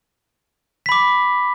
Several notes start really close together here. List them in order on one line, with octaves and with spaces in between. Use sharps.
B6 B5 D6